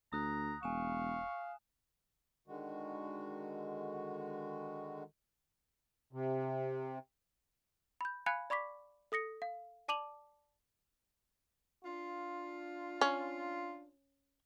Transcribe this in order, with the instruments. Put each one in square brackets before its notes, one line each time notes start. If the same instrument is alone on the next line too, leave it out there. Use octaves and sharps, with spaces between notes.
[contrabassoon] D2 [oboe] A#5 [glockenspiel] D#6 F#6
[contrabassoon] E1 [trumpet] F5 [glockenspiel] G#5 E7 [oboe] C#6
[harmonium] D3 D#3 G#3 F#4
[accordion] C3
[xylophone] B5 G6
F5 G#5 B5 F#6 G#6 C#7
D5 B5 C#6 D6 B6
A4 D#6 A#6 C#7
F5
D5 A5 D6 D#7 F7 F#7
[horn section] D4 F4
[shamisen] C#4